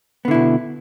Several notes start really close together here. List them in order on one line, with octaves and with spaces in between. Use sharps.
B3 D3 E4 B2